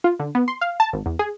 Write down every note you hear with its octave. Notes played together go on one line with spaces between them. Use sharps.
F4
D3
B3
C6
F5
A5
G#1
E2
G#4